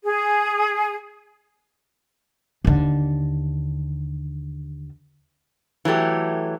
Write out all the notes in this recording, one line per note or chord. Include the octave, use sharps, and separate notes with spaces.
G#4
D#2 D3
E3 F#3 A3 G4